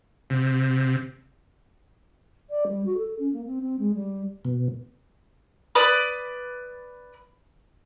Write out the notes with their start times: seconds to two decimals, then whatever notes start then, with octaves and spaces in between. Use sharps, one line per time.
0.30 C3
2.50 D5
2.66 G3
2.85 F#4
2.97 A4
3.19 C#4
3.33 A#3
3.45 C4
3.61 C4
3.79 G#3
3.94 G3
4.45 B2
5.75 B4 D5 B5 D#6